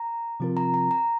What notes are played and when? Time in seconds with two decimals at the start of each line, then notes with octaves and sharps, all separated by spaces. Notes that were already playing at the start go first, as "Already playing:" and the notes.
Already playing: A#5
0.40 C3 F3 C4 F4 A#4
0.57 A#5
0.74 A#5
0.91 A#5